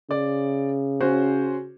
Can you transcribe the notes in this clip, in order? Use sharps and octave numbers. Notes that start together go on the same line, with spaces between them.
C#3 D5
C#4 F#4 C5